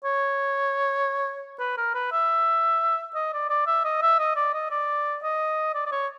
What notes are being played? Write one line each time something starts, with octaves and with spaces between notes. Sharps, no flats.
C#5
B4
A#4
B4
E5
D#5
D5
D5
E5
D#5
E5
D#5
D5
D#5
D5
D#5
D5
D5
C#5